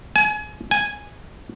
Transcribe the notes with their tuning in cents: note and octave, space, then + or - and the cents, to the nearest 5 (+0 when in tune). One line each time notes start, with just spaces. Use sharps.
G#5 +30
G#5 -5